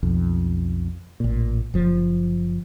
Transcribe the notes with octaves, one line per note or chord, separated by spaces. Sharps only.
B1 F2
A1 A#2
F#1 F3